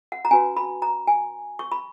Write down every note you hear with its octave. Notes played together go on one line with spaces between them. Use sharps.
F#5
A#5
C#4 F#4 B4 G#5
B5
A#5
G#5
C#6
B5